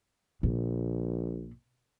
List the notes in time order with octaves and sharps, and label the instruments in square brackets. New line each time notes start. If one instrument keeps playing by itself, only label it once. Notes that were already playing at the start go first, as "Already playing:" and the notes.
[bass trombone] A#1 [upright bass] A#2